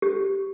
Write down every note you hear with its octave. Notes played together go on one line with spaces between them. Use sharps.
G4